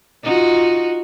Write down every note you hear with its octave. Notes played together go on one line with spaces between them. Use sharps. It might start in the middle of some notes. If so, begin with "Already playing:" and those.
D#4 F4 F#4